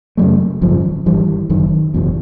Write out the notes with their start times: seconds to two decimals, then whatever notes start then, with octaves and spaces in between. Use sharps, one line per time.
0.17 F#2 C#3 F#3 A3
0.61 G#1 F#2 C#3 F3
1.06 G#1 G2 E3 G3
1.50 F#1 F#2 D#3
1.94 F#1 E2 B2